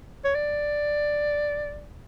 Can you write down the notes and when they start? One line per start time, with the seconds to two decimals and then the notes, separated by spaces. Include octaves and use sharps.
0.25 C#5
0.35 D5